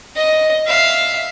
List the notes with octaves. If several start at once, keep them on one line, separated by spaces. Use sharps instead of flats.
D#5
E5 F5